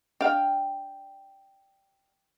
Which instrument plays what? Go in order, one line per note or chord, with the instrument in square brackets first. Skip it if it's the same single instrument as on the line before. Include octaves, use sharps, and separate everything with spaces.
[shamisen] D4 F5 [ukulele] G5